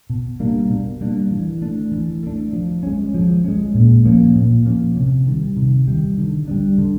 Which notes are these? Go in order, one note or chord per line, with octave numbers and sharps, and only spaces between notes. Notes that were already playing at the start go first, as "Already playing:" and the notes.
B2
G3 A#3 D4
B2
G3 A#3 D4
E3
A3 D4
E3
A3 D4
F3
G#3 C#4
F3
G#3 C#4
A#2
F3 A#3 C#4
A#2
F3 A#3 C#4
C3
D#3 G3
C3
D#3 G3
D3
G3 B3 D4
D3